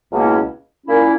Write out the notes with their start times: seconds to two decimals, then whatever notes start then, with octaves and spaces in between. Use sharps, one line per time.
0.12 C#2 B2 A#3 C#4 E4
0.86 A#2 A#3 C#4 E4